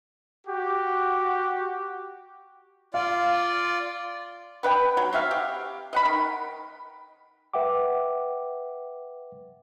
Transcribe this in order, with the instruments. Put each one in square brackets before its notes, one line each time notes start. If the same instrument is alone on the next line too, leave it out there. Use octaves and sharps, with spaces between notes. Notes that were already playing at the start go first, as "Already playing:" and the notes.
[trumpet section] F#4 G4
[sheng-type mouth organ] F4 D5 [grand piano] F5
[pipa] B3 B4 D#5 G5
F#3
C4 F#4 E5 F5
G4
D#5 F#5 B5
D#3
[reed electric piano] B4 E5 F#5 G5 D6